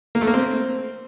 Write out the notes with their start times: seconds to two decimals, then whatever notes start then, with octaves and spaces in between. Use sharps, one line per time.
0.15 A#3
0.21 A3
0.28 A#3
0.34 C4